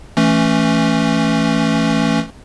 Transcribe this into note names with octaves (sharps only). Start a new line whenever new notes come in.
E3 A3 C#4